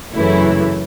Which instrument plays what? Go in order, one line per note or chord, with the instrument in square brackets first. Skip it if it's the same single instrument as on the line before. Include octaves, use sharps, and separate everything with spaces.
[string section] F#2 C#3 E3 A3 E4